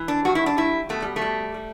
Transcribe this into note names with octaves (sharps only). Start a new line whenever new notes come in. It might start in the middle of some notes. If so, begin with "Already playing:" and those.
Already playing: E3
D4
G2 F#4
E4
D4
G3 E4
B2 A3
G3
A3
G3
G3